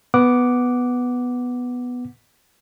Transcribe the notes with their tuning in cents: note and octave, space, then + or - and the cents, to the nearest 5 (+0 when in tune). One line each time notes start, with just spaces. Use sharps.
B3 +0 F#5 +0 D6 -5